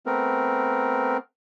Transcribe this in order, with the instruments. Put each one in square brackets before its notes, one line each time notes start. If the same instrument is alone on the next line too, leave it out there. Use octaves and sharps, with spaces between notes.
[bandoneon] A3 B3 C4 A#4